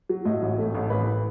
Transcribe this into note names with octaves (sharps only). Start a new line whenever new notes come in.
F#3
A2 D#5
A1
A3
A1
A1 B4